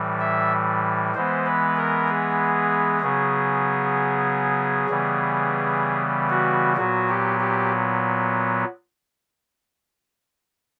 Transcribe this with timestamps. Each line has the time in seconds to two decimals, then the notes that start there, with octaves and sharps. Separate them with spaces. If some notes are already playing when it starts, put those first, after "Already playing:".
Already playing: A2 E3 G3
0.20 E5
1.15 E3 G#3 B3 C5
1.46 B4
1.77 A#4
2.09 G#4
3.01 C#3 F#3 B3
4.89 C#3 E3 G3 B3
6.30 F#4
6.77 A#2 F#3 B3 F#4
7.08 G4
7.40 G4